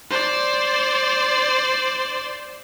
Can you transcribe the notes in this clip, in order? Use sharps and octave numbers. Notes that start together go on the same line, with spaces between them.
C5 D5